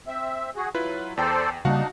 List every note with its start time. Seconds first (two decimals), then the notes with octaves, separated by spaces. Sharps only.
0.07 C4 E5
0.56 F#4 G#4
0.74 F#3 E4 F4 B4
1.17 E2 A4 C5 D5 G5 A#5
1.65 C#3 G3 A#3 D4 D#4 F#4 F5 F#5